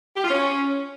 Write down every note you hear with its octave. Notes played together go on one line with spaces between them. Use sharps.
G4
F4
C#4